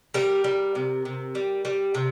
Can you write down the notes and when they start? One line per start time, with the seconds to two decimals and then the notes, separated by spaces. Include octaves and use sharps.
0.14 G3 A#4
0.44 G3
0.75 C3
1.05 C3
1.35 G3
1.65 G3
1.95 C3